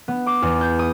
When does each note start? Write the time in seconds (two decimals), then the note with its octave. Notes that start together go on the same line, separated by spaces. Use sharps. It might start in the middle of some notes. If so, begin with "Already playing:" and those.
0.08 B3
0.26 D6
0.42 E2
0.61 G6
0.79 D#6